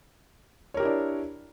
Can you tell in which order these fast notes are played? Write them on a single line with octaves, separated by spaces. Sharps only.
C#5 A#4 G4 E4 D4